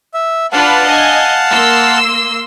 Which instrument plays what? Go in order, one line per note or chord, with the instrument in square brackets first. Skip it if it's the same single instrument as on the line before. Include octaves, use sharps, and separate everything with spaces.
[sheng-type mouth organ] E5
[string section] D4 F4 B4 [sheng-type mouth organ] F5 F#5 A5
[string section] D#5 G#5
A#3 C6 E6